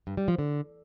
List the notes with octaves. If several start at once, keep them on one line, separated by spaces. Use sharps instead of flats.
G2
G3
F3
D3